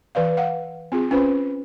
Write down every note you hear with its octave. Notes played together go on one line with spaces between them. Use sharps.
E3 B4 D5 F5
F5 F#5
C4 F4 G#4
C#4 F4 B4 C5 B5